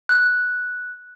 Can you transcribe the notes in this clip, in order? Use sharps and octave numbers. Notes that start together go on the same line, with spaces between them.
F#6